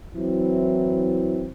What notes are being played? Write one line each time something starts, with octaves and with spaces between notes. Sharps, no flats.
E3 F#3 C4 E4